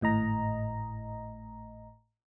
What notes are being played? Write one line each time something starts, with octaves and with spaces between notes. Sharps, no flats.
G#1 A2 D#5 A#5